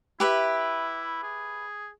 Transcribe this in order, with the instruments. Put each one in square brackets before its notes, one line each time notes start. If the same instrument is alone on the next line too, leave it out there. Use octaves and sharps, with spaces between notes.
[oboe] E4 [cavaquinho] G4 B4 E5
[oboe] G#4